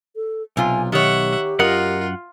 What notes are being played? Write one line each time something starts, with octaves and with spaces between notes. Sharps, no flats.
A4
B1 C3 F4 G#5
D#3 G4 C#5 E5 F#5
F#2 F4 A#4 D#5 F#5